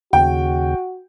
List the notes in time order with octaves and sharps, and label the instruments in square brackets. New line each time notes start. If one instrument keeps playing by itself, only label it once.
[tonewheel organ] D#2 C#3 [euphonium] F#4 [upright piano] G5